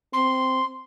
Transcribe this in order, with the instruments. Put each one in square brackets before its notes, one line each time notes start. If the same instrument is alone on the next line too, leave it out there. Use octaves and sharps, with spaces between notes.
[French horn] C4 [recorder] C6